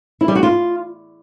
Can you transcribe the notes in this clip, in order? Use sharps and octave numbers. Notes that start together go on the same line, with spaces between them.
E4
G3
F#4
F4